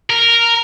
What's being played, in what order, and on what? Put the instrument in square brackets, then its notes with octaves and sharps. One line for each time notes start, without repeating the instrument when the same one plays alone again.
[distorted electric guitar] A#4